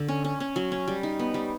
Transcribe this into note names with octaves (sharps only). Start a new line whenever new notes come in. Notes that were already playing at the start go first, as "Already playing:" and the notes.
Already playing: D3
C#4
C#4
C#4
F#3
C#4
G3
D#4
B3
G3